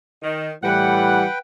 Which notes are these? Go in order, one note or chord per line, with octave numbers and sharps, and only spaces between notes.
D#3
A2 E3 G3 B4 F#5 G5